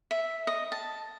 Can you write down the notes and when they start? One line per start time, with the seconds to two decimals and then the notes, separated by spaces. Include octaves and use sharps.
0.11 E5
0.47 D#5
0.72 A5